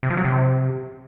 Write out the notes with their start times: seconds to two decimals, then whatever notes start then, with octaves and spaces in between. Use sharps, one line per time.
0.03 C3
0.10 F3
0.17 F#3
0.25 C3